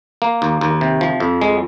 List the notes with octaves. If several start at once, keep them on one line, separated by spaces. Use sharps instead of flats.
A#3
D#2
D#2
C3
F3
F2
G#3